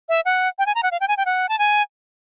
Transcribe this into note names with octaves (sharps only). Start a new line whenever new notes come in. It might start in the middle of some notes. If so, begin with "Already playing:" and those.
E5
F#5
G5
G#5
A#5
F#5
F5
G5
G#5
G5
F#5
A5
G#5